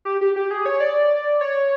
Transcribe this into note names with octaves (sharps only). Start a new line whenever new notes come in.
G4
G4
G4
G#4
C#5
D5
C#5